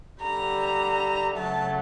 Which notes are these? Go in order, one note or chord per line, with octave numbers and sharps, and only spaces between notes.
D3 G3 A#5
C#3 F#3 A3 A5